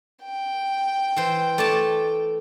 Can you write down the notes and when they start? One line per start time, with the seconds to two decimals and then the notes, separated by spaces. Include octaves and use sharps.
0.23 G5
1.16 E3 C5
1.58 A3 D5 A5